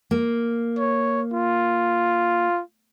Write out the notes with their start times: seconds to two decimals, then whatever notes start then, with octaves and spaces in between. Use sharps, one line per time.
0.11 A#3
0.78 C#5
1.34 F4